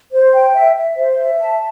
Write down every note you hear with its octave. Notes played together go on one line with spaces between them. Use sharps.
C5
G5
E5
E5
C5
E5
A5